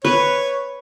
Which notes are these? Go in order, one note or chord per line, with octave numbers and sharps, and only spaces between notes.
B4 C#5